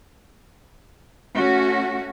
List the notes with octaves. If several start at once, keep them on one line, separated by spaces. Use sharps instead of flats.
A3 C#4 F#4